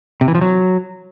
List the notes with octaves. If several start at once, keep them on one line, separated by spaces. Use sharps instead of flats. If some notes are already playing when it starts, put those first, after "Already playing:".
C3
E3
F3
F#3